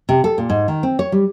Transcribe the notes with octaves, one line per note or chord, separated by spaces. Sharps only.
C3
A4
A#2
G#2
D#3
C4
C#5
G3